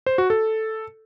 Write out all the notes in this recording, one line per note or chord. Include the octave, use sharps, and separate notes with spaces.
C5
F#4
A4